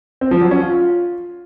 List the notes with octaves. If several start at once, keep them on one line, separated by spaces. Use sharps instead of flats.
C4
F3
F#3
C#4
F4